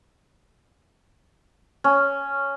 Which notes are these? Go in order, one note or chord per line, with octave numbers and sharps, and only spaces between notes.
C#4